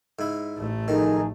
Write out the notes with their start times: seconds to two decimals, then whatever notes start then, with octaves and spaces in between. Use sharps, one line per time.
0.19 G#2 E4
0.57 A1 A3
0.88 F2 D#3 D#4 G#4